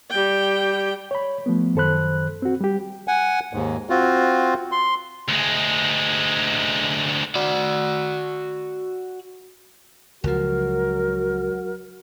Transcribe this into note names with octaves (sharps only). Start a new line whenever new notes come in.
G3 G5
C#5 B5
F3 A3 B3
F#2 D#3 A4 C5 B5 F#6
C4 F#4
G3 G4
F#5 G#5
D#2 G#2
C4 F4 F#4
C6
D2 G#3
F#4 D5
C#2 F3 F#3 F#4 A#4